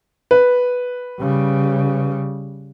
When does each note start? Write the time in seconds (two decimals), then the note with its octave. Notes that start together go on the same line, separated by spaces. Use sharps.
0.31 B4
1.20 C#3 G3